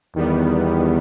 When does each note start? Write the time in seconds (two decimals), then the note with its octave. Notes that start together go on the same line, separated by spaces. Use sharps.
0.16 E2 D#3 G3 B3